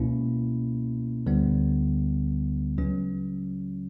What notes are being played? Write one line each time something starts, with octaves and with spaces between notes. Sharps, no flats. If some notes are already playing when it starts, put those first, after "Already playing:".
Already playing: C#2 B2 A#3 C#4 E4
D2 D3 G3 B3
C#2 C#3 F#3 C#4